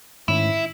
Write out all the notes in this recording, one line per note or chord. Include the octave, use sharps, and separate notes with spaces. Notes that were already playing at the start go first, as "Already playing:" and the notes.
G#2 D#3 A3 C#4 E4